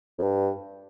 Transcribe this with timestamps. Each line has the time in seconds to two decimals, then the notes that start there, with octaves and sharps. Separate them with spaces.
0.18 F2
0.23 G2